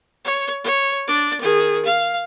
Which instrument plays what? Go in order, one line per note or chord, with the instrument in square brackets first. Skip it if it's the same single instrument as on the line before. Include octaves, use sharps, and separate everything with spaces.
[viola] C#5
C#5
D4 D5
D#3 G#4
F5